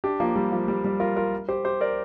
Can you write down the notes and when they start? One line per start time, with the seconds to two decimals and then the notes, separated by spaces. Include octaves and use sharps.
0.04 D4 G4
0.20 F3 A#3
0.36 G3
0.52 F3
0.68 G3
0.84 G3
1.00 F4 A#4
1.16 F4 A#4
1.48 G4 C5
1.65 G4 C5
1.81 A#4 D5